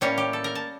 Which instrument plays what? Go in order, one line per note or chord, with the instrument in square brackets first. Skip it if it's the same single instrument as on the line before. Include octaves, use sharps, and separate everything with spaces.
[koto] A2 G3 A#3 C#4 C#5
G4
A4
A#4
A5